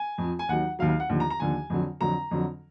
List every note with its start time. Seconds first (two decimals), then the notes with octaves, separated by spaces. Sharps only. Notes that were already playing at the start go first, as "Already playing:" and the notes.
Already playing: G#5
0.18 F2 F3
0.39 G#5
0.49 D#2 D#3 F#3 F#5
0.79 D#2 D#3 F#3 F5
0.89 F5
1.00 F#5
1.09 D#2 D3 F3
1.20 A#5
1.30 A#5
1.40 D#2 D3 F3 G#5
1.70 F2 D3 F#3
2.01 F2 D3 F#3 A#5
2.31 F2 D3 F#3